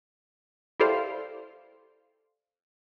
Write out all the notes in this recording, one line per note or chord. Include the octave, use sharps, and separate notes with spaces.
E4 G4 A4 C5 D5 F5